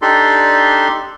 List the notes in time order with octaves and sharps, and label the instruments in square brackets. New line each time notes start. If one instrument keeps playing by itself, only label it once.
[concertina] D4 D#4 G4 A4 D5 C6